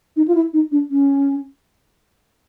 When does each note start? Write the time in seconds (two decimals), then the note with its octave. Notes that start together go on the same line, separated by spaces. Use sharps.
0.16 D#4
0.28 F4
0.35 E4
0.53 D#4
0.72 D4
0.91 C#4